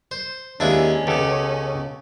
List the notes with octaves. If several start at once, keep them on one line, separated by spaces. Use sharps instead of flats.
C5
D#2 G#3 C#4 D4 E4 F4
C#2 C#3 B3 G4 A4